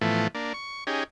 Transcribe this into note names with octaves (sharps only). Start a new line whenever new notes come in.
A2 E3 F3 A3 B3
A#3 D4
C#6
C#4 D#4 G4 G#4